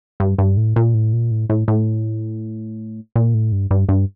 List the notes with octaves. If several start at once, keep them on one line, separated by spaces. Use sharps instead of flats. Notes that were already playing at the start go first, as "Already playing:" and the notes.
G2
G2
A2
A#2
A2
A#2
A2
A2
A2
A#2
A2
G2
G2
G2